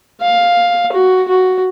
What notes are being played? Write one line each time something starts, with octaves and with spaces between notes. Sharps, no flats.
F5
F#4
F#4